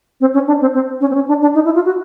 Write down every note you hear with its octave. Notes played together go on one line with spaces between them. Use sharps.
C4
C#4
D4
C4
C4
C#4
C4
C#4
D4
D4
D#4
E4
F4
F#4